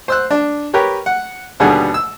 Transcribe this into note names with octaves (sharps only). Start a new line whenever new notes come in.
C5 E6 F#6
D4
G4 A#4 B4 C#5
F#5
D#2 B2 D3 G3 G#4 F#5
E6